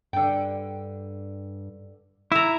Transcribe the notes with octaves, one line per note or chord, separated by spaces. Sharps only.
G2 D3 G5
E4 E5 A#5